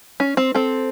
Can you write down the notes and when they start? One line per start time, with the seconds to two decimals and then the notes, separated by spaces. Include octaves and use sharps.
0.20 C#4
0.37 C4
0.55 C4 A4